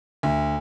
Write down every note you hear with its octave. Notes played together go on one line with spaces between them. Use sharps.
D2